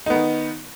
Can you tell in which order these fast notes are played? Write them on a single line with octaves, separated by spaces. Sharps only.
D#4 B3 D#3